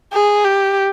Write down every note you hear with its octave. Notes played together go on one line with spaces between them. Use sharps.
G#4
G4